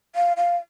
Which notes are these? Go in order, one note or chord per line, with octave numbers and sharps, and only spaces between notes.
F5
F5